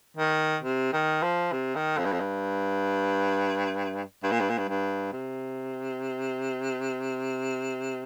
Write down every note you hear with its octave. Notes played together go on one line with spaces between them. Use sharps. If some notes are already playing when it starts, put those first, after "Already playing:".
D#3
C3
D#3
F3
C3
D#3
F2
G2
F2
G2
G2
A#2
G2
A#2
G2
G2
C3